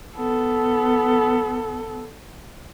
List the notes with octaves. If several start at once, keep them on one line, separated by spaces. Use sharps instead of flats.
B3 A4